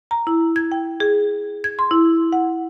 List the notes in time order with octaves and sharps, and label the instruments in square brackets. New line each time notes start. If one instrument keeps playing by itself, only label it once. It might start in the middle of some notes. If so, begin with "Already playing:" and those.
[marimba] A#5
E4
G#6
G5
G#4
G#6
C6
E4
F#5